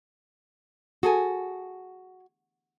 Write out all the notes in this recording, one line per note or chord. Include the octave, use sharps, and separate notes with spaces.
F#4 G#4 A4 G#5